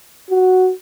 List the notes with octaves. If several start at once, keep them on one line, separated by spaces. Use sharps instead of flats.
F#4